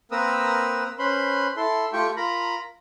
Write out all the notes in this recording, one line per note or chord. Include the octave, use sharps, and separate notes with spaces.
A#3 C4 A#4 B4 D#6 E6
C#4 B4 C5 B5 C6
E4 A4 C6
A3 F4 G4 G5 C#6
F4 A#4 A#5 B5